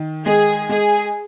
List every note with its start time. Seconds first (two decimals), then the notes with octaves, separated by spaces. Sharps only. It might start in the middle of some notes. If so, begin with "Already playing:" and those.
Already playing: D#3
0.26 G#3 G#4
0.69 G#3 G#4